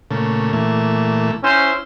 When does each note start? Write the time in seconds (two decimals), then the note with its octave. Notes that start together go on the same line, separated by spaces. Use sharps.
0.11 A#2 C#3 A3
0.53 A#2 E3 A3
1.44 C#4 E4 C5